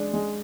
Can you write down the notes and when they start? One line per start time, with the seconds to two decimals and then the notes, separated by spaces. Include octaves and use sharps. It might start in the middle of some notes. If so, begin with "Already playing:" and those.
Already playing: G#3 D4
0.13 G#3